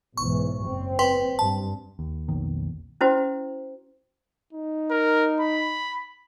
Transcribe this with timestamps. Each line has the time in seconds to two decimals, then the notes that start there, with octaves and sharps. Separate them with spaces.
0.17 B1 G#2 E3 C#6
0.66 F#1 C4
0.99 B4 G5 C6
1.39 G2 A5
1.99 D#2
2.28 B1 F2 D#3 A#3
3.01 C#4 E4 F#4 C5
4.53 D#4
4.91 A#4
5.40 B5